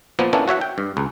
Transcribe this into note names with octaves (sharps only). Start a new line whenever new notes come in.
A#2 F3 A#3 B3
A#3 B3 C#4 D4 E4 A4
F#4 C#5 E5 F#5
G5
G2
C#2